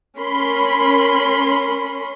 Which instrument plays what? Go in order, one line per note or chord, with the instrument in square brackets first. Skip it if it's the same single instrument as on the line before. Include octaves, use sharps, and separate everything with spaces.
[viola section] C#4 A#4 B5 C6